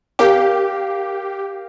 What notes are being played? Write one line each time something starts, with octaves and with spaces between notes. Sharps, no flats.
G4 A#4 F5 D6